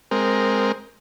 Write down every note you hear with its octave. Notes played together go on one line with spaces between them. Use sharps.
G#3 C4 A#4